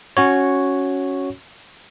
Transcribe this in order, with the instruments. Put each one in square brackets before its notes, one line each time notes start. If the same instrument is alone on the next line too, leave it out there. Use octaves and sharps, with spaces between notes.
[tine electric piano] C#4 F#4 C#5